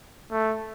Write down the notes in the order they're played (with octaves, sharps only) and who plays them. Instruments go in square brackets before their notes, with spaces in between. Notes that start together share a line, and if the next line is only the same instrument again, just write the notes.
[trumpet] A3